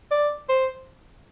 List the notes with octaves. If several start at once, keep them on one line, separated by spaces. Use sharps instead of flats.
D5
C5